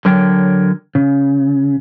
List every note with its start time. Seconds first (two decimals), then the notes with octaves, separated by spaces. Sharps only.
0.05 D3 F#3 A#4 C#5 G5
0.95 C#3